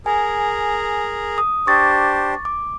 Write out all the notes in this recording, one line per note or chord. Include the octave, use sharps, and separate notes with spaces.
G#4 A#4 G#5
D#6
D4 G4 C5 C#6 D6 A6
D6